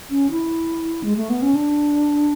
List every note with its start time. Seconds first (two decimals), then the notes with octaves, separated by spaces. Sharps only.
0.10 C#4
0.31 E4
1.03 G#3
1.16 A3
1.30 B3
1.42 C#4
1.55 D4